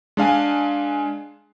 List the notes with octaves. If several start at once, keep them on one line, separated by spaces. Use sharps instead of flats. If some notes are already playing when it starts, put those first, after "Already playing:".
G#3 D4 F5 G#5